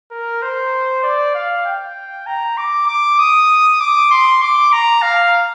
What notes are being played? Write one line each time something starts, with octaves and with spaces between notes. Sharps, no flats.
A#4
C5
D5
F5
G5
A#5
D6
D6
D#6
D6
C6
D6
A#5
F5